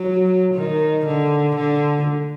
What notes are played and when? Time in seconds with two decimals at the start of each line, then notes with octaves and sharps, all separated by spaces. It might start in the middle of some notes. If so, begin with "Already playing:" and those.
Already playing: F#3
0.54 D#3
1.06 D3
1.56 D3